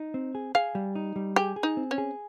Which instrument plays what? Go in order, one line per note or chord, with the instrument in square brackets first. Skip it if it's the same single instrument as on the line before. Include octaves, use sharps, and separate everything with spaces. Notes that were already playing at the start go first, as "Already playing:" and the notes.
Already playing: [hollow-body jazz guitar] D#4
C4
G#4
[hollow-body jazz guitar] G#4 [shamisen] F5
[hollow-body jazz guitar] G3
D#4
G3
[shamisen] G4 [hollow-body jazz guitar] G#4
[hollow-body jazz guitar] G#4
[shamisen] D#4
[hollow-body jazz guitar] C4
[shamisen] C#4
[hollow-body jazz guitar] G#4